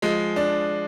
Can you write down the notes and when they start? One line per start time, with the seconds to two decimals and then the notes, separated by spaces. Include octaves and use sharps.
0.02 F3 G#3
0.36 D4